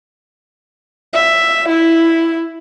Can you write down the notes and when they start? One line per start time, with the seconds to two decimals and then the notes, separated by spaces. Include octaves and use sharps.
1.13 E5
1.69 E4